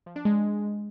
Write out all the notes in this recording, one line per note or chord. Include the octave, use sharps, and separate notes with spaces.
F3
D4
G#3